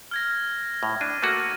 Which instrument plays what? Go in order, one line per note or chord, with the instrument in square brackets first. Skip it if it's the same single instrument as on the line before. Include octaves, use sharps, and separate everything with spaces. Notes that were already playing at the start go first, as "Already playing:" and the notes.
[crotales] F6 G#6 A#6
[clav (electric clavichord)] A2
[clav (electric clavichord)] D4 [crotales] D#7
[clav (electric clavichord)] A3 A#3 F#4